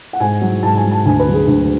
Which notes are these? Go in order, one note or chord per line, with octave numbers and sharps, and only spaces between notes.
F#5
G#2 G#5
F#3
G#2 A5
G#5
F#3
A5
D2 G#5
B4
D3 F#3
G#4
D2